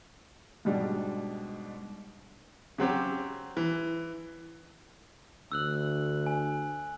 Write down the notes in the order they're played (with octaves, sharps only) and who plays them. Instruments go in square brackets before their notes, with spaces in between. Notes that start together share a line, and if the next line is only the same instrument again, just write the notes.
[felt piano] G#2 B2 G3 G#3 D4
[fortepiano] C#3 F#3 C4 G4
E3
[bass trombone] D2 [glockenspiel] E6 F#6 F#7
[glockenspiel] G#5